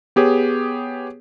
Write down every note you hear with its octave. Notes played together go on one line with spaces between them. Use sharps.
B3 G4 G#4 C#5